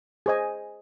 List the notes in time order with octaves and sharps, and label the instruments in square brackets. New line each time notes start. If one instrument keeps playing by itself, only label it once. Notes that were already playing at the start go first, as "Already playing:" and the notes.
[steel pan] G#4 C5 D#5 G#5